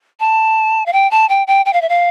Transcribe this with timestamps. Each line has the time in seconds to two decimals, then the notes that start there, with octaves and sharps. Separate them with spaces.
0.20 A5
0.86 F5
0.93 G5
1.11 A5
1.29 G5
1.47 G5
1.66 G5
1.73 F5
1.82 E5
1.89 F5